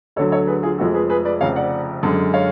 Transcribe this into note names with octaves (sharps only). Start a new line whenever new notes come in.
D2 D3 F#3 A4 C#5
A4 C#5
G#4 B4
F4 G#4
F1 F2 F3 G#3 F#4 A4
G#4 B4
G#4 B4
B4 D5
F1 F2 C#3 C#5 F5
D5 F#5
F#2 D3 G#3
C#5 F5